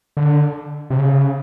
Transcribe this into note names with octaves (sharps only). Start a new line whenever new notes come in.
D3
C3
C#3